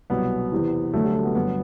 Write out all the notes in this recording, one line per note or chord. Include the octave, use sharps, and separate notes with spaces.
C2 B2 F#3 B3
E2 C3 E3
D2 D3 F#3 A3
G3
A3
B3
G1 G2 D3 F#3 B3